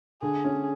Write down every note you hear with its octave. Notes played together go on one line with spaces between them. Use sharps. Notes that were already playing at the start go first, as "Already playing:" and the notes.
D3 G#4
C#4